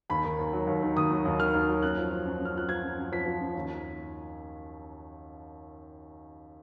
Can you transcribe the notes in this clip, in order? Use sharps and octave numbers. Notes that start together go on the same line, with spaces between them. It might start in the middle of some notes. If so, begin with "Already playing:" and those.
D#2 B5
D#3
D#2
F#3
D#2
D#3
D#2 D#6
F#3
D#2
D#3 F6
D#2
F#3
F#2 F#6
F3
F3
F#2
F#2
F6
F3 F#6
F3 G#6
F#2
F#2
F3 B6
F3
F#2
D#2